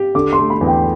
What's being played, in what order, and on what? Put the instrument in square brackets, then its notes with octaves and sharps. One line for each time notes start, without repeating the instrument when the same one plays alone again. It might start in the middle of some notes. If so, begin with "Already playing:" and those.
Already playing: [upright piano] G4
[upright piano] D3 [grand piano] D6
[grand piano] C6
[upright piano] A3
[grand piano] B5
[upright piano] E2
[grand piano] G5